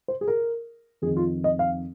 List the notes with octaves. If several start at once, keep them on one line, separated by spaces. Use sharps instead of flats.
C5
G#4
A#4
F2 D#3 G#4
F4
D#5
F5